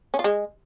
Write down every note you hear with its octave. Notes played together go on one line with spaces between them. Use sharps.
C#4
F4
G#3